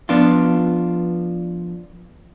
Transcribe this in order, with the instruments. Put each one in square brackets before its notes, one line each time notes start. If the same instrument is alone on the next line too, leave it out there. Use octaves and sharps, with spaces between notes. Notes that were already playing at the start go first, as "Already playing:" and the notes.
[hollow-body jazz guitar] F3 B3 D4 F4